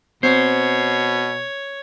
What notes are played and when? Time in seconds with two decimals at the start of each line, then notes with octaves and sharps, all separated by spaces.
0.23 B2 C4 C5 C#5